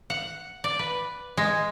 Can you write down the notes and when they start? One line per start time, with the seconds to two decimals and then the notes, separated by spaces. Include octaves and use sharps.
0.10 F#5
0.64 D5
0.79 B4
1.37 G#3